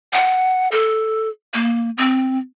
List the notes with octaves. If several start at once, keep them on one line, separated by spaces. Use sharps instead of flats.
F#5
A4
A#3
C4